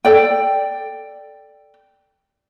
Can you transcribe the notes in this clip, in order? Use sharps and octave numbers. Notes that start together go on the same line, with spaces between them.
A4 D5 G5